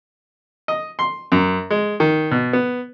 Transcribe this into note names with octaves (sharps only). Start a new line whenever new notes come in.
D#5
C6
F#2
G#3
D#3
B2
B3